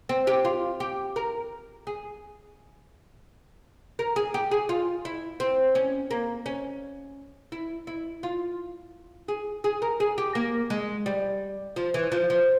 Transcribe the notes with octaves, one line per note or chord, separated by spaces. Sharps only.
C4
G4
F4
G4
A#4
G#4
A#4
G#4
G4
G#4
F4
E4
C4
C#4
A#3
C#4
E4
E4
F4
G#4
G#4
A#4
G#4
G4
A#3
G#3
G3
F3
E3
F3
F3